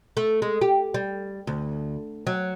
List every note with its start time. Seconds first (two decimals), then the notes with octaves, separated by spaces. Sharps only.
0.17 A3
0.42 G#3
0.61 G4
0.94 G3
1.47 D2
2.27 F#3